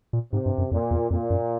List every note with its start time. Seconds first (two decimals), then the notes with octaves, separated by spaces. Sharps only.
0.13 A#2
0.33 G#2 C3
0.46 G2
0.58 F#2
0.71 F2 A#2
0.91 E2
1.10 F2 A#2
1.30 F#2